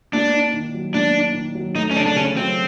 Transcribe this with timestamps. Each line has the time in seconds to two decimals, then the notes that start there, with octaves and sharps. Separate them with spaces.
0.13 A#3 D4
0.33 D#4
0.53 D#3
0.74 F#3
0.94 A#3 D4
1.15 D#4
1.34 D#3
1.55 F#3
1.75 A3 D#4
1.91 C#4
1.95 C#3 D4
2.06 D4
2.15 C#3 C#4
2.37 F#3 C4